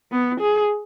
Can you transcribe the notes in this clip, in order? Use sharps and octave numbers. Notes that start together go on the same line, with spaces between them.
B3
G#4